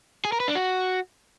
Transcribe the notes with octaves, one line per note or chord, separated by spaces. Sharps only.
G#4
A#4
B4
D4
F#4